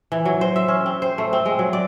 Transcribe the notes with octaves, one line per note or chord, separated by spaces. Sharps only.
E3
F#3
C5
E5
C#4
C4
C5
A3
C4
G#3
F#3
D5